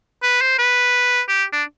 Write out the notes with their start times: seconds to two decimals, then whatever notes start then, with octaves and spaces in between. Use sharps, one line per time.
0.23 B4
0.41 C5
0.59 B4
1.28 G4
1.52 D4